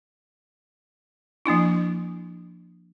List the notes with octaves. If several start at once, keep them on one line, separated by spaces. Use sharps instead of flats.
F3 A#3 D4 E4